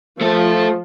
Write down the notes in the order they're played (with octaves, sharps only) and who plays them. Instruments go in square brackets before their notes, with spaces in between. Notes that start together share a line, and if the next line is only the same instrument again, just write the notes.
[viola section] F3 [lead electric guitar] A3 A4